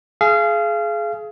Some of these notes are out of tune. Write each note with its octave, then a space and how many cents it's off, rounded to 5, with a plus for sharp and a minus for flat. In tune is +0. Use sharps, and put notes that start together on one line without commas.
G#4 +25 F5 -30